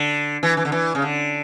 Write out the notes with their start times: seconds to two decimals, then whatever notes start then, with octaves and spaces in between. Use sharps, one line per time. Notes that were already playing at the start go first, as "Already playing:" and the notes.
Already playing: D3
0.43 E3
0.57 E3
0.65 D3
0.72 E3
0.95 C#3
1.02 D3